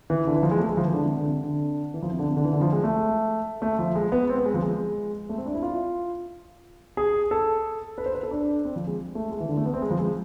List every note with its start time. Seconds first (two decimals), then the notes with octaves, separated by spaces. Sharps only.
0.10 E3
0.27 D3
0.35 E3
0.43 F3
0.51 G#3
0.60 A3
0.69 G#3
0.77 F3
0.85 E3
0.94 D3
1.05 C3
1.16 D3
1.27 C3
1.44 D3
1.94 E3
2.03 F3
2.11 C3
2.19 D3
2.27 C3
2.37 D3
2.45 E3
2.53 D3
2.61 F3
2.73 G#3
2.83 A3
3.62 A3
3.79 F3
3.95 G#3
4.12 B3
4.29 C4
4.37 B3
4.46 G#3
4.54 F3
4.63 G#3
5.29 A3
5.38 C4
5.46 D4
5.54 E4
5.62 F4
6.97 G#4
7.31 A4
7.98 B4
8.06 C5
8.15 B4
8.23 A4
8.31 D4
8.65 C4
8.76 F3
8.87 G#3
9.15 A3
9.32 G#3
9.40 E3
9.49 D3
9.57 A3
9.66 B3
9.74 C4
9.82 G#3
9.91 F3
9.99 G#3